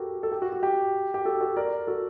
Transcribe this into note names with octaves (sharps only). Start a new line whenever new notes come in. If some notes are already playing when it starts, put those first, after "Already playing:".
Already playing: F#4 G4 A4 A#4
A4
G4
F#4
F#4
G4
G4
F#4 A4
F#4 A4
A#4 D5
F#4 A4